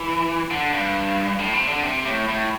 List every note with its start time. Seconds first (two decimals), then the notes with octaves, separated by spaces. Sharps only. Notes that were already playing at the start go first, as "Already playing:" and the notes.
Already playing: E3
0.50 D3
0.73 G2
1.39 A2
1.54 C3
1.69 D3
1.83 C3
2.05 A2
2.28 A2